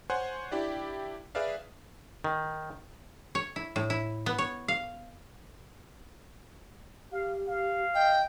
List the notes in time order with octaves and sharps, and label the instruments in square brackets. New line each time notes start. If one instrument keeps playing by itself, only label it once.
[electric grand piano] C5 C#5 F#5 G#5 C6
D4 E4 G4 D5
G#4 B4 D5 E5 F5
[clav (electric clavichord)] D#3
[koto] C#5
E4
A2
E4
B3
C#5
F5
[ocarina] G4 [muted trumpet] F5
[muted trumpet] F5
[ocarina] D#5 [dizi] G5